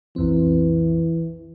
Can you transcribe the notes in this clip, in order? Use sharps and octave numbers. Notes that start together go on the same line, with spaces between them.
B1 F2 E3 C4